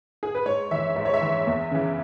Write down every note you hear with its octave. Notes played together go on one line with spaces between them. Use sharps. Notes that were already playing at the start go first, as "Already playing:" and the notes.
G#4
B4
G#2 C#5
E3 E5
G#2 E5
C#5
E5
E3
E2
C#3 E3